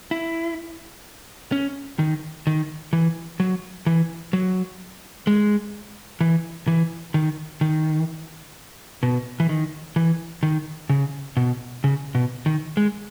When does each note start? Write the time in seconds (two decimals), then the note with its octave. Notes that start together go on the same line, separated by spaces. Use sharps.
0.11 E4
1.52 C#4
1.99 D#3
2.47 D#3
2.93 E3
3.40 F#3
3.86 E3
4.33 F#3
5.27 G#3
6.21 E3
6.68 E3
7.14 D#3
7.61 D#3
9.03 B2
9.40 E3
9.49 D#3
9.96 E3
10.43 D#3
10.89 C#3
11.37 B2
11.84 C#3
12.15 B2
12.46 D#3
12.77 G#3